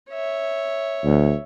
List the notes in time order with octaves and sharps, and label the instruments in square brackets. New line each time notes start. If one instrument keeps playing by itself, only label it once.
[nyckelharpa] C#5 E5
[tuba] D2